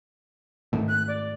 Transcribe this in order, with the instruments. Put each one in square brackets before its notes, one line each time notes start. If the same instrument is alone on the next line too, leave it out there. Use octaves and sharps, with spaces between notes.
[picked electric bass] G#2 D#3 A3
[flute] F#6
D5